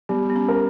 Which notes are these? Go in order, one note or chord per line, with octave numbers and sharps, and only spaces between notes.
G3 B3
B3
C#4
A#4